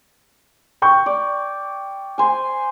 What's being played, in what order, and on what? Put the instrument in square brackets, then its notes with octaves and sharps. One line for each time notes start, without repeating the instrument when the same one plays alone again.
[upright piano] G5 C#6 G6
[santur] D5
C5 G#5